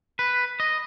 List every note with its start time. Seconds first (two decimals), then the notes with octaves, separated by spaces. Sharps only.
0.19 B4
0.60 D#5